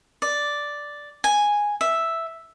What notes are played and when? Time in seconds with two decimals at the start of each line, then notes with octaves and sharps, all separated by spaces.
0.22 D5
1.24 G#5
1.81 E5